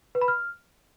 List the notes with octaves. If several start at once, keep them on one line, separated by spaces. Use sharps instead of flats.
B4
B5
F6